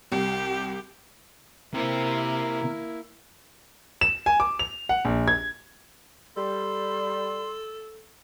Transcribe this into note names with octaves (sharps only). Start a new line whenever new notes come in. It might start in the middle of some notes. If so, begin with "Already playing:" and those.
C2 G4
C3 A#3 E4 A#4 C5
E7
G#5
D6
F7
F#5
A#1
G#6
G3 A4 C6